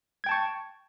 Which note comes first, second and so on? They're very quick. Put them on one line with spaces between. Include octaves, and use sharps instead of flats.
G#6 G5 A5 C#6